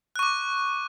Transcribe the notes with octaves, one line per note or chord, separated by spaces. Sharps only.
C#6 D6 F#6